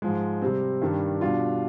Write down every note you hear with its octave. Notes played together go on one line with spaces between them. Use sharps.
G#2 F3 G#3
C3 G3 C4
G2 D#3 G3 D4
B2 G3 D4 F4